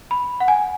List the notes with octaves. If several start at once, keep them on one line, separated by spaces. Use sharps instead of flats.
B5
F#5
G#5